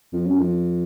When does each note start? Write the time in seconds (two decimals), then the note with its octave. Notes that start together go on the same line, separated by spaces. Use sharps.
0.13 F2
0.26 F#2
0.39 F2